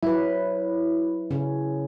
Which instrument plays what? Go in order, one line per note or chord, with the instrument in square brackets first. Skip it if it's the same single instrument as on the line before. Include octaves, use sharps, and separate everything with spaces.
[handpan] F#3 B4 [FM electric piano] E4
[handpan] C#3 C#4